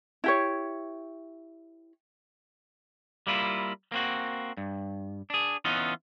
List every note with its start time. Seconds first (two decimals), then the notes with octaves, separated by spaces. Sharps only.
0.24 E4 G4 C#5
3.27 G3 A#3 E4 F4
3.92 A#3 C4 F#4
4.57 G2
5.30 D4 G#4
5.65 E3 B3 C#4 D#4 F4